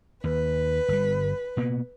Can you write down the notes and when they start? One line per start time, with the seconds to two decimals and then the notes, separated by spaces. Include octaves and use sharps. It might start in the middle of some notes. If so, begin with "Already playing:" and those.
0.24 D#2 B4
0.88 G1 G3
1.57 B2 A#3 B3